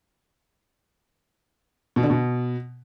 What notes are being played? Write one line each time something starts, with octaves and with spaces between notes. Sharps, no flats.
B2
D3
B2